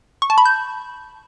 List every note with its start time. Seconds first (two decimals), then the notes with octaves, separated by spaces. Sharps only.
0.22 C#6
0.30 A5
0.38 B5
0.45 G6